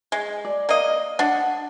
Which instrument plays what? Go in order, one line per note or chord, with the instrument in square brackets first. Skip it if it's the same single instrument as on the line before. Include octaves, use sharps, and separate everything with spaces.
[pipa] G#3
[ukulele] D5
[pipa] A#3 D#5
[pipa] D4 [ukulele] F#5